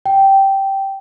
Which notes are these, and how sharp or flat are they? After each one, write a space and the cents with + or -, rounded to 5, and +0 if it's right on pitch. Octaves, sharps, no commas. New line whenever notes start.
G5 -10